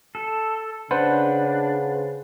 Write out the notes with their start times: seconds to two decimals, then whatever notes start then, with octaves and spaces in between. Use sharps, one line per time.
0.15 A4
0.91 C#3 D4 B4 C5 F#5